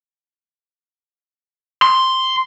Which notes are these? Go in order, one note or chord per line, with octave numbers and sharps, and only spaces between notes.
C6